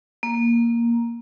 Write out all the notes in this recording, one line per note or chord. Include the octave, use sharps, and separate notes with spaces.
A#3